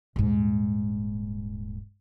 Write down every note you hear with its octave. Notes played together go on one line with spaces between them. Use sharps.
D#1 G#2